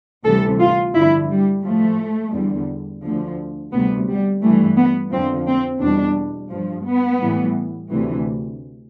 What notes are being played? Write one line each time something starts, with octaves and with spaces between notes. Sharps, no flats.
D2 C3 E3 G3 A4
F4
G2 D3 F3 E4
G3
A2 F3 A3
E2 D3 G3
D2 D3 F3
D2 C3 G3 B3
G3
G2 E3 G3 A3
B3
F2 D3 F3 C4
C4
E2 B2 G3 D4
G2 F3
B3
A2 E3 G3
D2 C3 E3